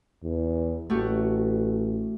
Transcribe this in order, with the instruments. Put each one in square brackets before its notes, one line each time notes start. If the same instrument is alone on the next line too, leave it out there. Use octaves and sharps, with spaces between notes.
[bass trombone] E2
[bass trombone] A1 [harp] A3 F#4 G4